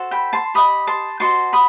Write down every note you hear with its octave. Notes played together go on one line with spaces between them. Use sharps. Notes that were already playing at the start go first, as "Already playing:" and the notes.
Already playing: F#4 A4 C5
G5 B5
A5 C6
G4 D#5 B5 D#6
A5 C6
F#4 C5 D#5 A5 C6
B5 D#6